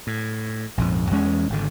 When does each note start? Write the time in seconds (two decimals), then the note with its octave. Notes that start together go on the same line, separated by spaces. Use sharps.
0.07 A2
0.77 A#1 F2 G#2
1.11 E2 G#3 C#4
1.50 G#1 D3